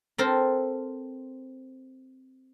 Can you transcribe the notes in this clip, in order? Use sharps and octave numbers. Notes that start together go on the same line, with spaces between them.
C4 A4 A#4 C5